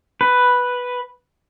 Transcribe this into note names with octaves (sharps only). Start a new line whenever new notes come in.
B4